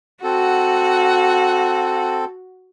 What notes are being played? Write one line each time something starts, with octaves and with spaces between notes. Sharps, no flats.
C4 F#4 A4 F#5